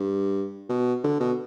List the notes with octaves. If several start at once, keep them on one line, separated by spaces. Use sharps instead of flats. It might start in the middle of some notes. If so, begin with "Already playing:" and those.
Already playing: G2
B2
D3
B2